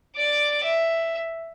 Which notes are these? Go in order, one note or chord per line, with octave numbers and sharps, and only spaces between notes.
D5 D6
E5